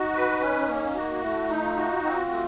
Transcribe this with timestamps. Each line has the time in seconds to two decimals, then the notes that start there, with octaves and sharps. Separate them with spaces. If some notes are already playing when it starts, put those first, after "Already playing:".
Already playing: D#4 F#4
0.15 B4
0.41 C#4
0.68 A#3
0.95 F#4
1.22 A3 E4
1.49 D#4
1.63 F4
1.77 F#4
2.03 C4 F4
2.31 A3